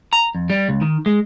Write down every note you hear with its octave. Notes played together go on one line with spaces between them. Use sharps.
A#5
F2
G3
C#2
D#3
G#3